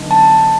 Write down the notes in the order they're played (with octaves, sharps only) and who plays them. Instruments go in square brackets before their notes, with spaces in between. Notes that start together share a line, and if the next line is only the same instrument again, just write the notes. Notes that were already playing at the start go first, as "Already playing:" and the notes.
Already playing: [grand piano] D3 F#3 B3 D#4
[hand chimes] A5